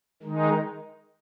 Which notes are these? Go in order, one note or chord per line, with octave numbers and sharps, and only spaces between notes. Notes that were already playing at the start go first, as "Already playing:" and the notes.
D#3 G#3 D#4